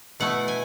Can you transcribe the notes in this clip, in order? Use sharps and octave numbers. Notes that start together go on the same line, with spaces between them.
B2 A3 E4 F#5
G#5